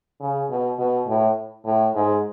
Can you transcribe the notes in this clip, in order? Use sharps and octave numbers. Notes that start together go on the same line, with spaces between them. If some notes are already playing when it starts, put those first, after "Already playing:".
C#3
B2
B2
A2
A2
G#2